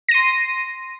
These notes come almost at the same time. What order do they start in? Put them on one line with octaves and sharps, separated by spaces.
A#6 D#7 C6